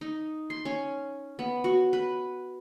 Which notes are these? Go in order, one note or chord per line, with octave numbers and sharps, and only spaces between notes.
D#4
C6
C#4
B3
F#4
B4